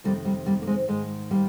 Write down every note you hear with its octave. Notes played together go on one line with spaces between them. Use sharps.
F2 C3 D#3 G3 A#3
G3 A#3
G3 A#3
A#3
G#3 C4
G#2 D#3 G#3
G3 A#3